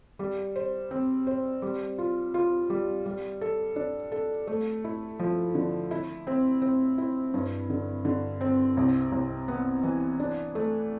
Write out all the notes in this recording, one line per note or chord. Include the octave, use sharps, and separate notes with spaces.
G3
C5
C4
C5
G3
F4
F4
G3
G3
A4
D4
A4
A3
E4
F3
D3
E4
C4
C4
E4
G2
D3
D3
C4
C2
C2
B3
E3
D4
A3